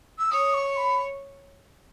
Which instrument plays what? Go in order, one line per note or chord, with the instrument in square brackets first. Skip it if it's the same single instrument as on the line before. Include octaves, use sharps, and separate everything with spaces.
[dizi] E6
[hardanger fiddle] C#5 [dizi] D#6
[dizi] C#6
B5